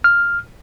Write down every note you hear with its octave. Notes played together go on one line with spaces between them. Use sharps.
F6